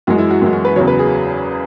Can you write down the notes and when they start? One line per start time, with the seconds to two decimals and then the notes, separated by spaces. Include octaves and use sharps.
0.07 F#2 E3 G#3 F#4
0.18 E4
0.30 F#4
0.42 F#2 E3 G#3
0.53 F#4
0.65 B4
0.76 E2 C#3 F#3 C#5
0.87 B4
0.99 G#4